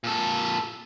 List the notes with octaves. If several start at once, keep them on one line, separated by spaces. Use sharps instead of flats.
A#2 A4